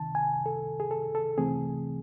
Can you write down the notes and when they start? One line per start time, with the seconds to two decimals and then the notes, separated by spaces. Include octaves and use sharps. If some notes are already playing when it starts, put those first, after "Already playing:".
Already playing: C#2 C3 D#3 A5
0.15 G#5
0.46 A4
0.80 G#4
0.91 A4
1.15 A4
1.38 C#2 C3 E3 A3 C4 G#4